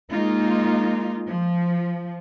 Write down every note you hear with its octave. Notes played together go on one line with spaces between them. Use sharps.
G#3 A#3 D#4 F4
F3